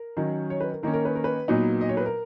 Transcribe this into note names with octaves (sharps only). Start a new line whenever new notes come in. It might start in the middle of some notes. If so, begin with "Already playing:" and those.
Already playing: A#4
D#3 F#3 C#4
C#5
B4
A#4
D#3 A#3 C#4 A#4
A#4
B4
A#4
B4
A#2 F#3 B3 D#4
D#5
C#5
B4
A#4